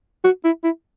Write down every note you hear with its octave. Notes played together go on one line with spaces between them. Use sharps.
F#4
E4
E4